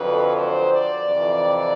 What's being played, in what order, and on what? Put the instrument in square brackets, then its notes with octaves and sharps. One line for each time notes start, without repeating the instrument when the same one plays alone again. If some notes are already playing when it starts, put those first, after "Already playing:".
Already playing: [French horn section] F2 D3 F#3 B4
C5
D5
F2 C3 E3